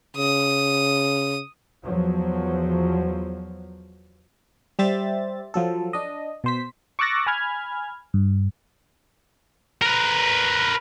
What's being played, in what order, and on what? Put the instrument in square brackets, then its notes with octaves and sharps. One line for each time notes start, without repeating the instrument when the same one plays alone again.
[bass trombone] C#3 [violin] D#6
[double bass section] E2 F3 F#3
[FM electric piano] G3 G4 C5 E5 A6
F3 F#3 A4
D4 D#5
B2 C5 B6
C#6 D6 E6 F#6 A6 A#6
G#5 B5 F6 G#6
G2
[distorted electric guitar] A#4 B4